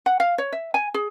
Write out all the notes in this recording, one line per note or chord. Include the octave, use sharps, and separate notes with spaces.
F#5
F5
C#5
E5
G#5
G#4